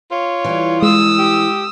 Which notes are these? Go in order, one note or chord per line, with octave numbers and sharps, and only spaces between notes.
F4 C#5
E3 G3
G#3 D#6 E6
G4